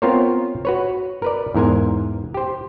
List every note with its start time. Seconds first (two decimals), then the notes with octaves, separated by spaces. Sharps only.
0.02 B3 C4 F4 A#4 C5 C#5
0.65 F#4 B4 C#5
1.22 A#4 B4 D5
1.54 E2 G#2 A#4 C5 G#5
2.34 G4 C5